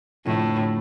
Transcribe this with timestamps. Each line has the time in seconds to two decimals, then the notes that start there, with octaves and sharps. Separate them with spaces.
0.25 F1 F2 A2 D3 F3